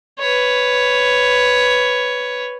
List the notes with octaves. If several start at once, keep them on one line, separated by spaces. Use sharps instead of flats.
B4 C#5